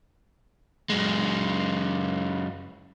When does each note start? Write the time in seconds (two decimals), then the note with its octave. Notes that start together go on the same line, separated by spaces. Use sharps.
0.90 F#2 G#3